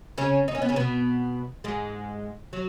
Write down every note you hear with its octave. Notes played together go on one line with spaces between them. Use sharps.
C#3 C#4
D#4
C#4
B3
C#3 C#4
B2 B3
G#2 G#3
F#3